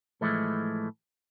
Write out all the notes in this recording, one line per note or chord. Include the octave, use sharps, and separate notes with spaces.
A2 E3 F3 G#3 A3